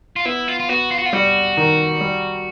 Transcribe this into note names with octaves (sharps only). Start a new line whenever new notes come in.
F4
B3 E4
F4
F4
B3 F#4
F4
F#4
F4
G3 F#4
D#3
G3